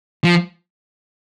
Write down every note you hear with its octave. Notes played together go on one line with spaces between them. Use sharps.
F3